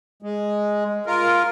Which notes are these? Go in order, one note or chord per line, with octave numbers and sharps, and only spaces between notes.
G#3
F4 A#4